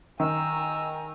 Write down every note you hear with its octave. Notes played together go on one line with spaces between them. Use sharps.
D#3 G#5 A#5 E6